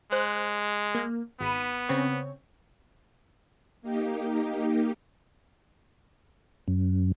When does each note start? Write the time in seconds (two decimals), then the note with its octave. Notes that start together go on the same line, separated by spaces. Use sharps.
0.12 G#3 C5 F#6
0.95 A#3
1.41 G#1 B3 B5 D#7
1.89 C#3 C4 C#5
3.82 A#3 D#4 G4
6.68 F#2